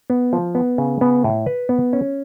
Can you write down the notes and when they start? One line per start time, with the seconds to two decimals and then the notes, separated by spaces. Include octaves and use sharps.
0.10 B3
0.33 F3
0.55 B3
0.78 C#3
1.01 B3
1.24 A2
1.46 B4
1.69 B3
1.93 C#4